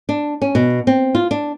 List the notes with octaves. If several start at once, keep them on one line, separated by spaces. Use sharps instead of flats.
D4
C#4
B2
C4
F4
D4